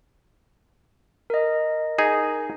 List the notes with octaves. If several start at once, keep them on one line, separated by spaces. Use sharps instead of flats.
A#4 D#5
D#4 G#4